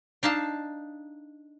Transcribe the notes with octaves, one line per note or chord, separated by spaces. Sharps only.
D4 D#4 F5 A5